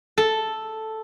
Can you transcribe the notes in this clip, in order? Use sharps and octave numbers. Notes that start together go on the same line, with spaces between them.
A4